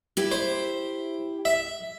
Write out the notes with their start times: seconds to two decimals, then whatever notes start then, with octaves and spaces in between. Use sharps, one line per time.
0.17 E4 G4
0.32 C5
1.45 E5